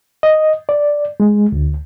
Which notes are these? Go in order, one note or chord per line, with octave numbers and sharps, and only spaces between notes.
D#5
D5
G#3
D2